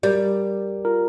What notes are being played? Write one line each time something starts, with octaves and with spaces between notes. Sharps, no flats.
G3 A#4 D5
F4 A#4